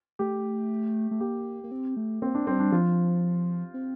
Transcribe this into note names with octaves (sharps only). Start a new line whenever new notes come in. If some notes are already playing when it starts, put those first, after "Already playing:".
A3 G4
A3
A#3 G4
A#3
C4
A3
A#3 C4
D4
G3 C4
D4
F3 F4
C4